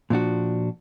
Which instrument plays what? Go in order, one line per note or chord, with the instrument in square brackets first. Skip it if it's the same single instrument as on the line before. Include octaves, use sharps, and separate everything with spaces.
[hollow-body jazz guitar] A#2 F3 D4 F#4